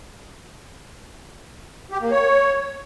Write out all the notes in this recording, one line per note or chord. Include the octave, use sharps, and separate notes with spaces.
G4
A#3
C#5